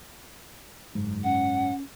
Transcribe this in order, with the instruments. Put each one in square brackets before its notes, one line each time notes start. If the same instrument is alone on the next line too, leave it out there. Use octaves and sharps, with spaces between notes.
[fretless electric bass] F#1 G#2
[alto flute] C#4 [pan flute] F#5